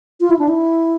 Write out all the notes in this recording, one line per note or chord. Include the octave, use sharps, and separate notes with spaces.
F4
E4
D4
E4